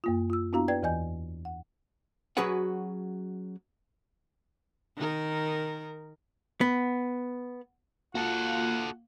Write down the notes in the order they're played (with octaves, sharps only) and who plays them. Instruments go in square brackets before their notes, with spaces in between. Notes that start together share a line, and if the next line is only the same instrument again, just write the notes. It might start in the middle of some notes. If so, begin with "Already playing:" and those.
[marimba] F#2 A#3 F4
F4 E6
B3 D4 E4 F#4 F5 A#5
B4 D5 G5 G#6
E2 E3 D5 D#5 G#5 G6
F#5
[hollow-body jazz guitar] F#3 C#4 F#4 G#4 B4 F#5
[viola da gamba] D#3 D#4 A#4
[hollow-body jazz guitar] B3
[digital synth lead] A#3 [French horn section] F4 [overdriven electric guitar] F#4 A4 [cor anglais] F#5